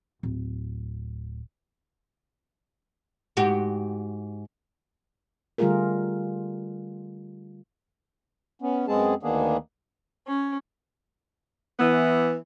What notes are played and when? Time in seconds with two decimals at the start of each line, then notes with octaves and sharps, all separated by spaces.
0.23 D1
3.37 G#2 F#4 G4
5.58 D3 G3 A3 F4 G#4 A#4
8.62 B3 C#4
8.87 F#2 G#3 B3 C4 G#4 A5
9.23 D2 D#3 A#3 B3 D4 G#4
10.27 C#4
11.79 E3 B3